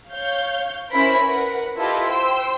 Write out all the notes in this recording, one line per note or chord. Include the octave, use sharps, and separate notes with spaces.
C#5 F5 G6
C#4 E4 A#4 C5 B5
A#4 B4 F#5
E4 F4 G4 A4 B4 D#5
C5 G5 C6 E6